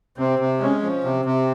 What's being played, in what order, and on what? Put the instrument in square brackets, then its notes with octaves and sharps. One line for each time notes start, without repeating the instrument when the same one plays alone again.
[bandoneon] C3 [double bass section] C4
[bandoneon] C3
[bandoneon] G#3 [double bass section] C#4
[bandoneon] F3
[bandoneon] C3 [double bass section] C4
[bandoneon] C3